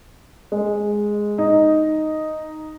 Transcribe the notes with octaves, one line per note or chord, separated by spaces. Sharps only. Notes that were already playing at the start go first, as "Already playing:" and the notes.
G#3
D#4